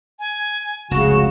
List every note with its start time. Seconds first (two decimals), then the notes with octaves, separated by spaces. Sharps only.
0.19 G#5
0.91 F1 C#2 C#3 F#4 E7